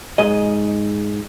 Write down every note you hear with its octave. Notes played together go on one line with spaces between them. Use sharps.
G#2 G#4 D#5